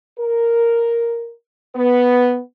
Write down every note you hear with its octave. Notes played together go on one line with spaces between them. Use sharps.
A#4
B3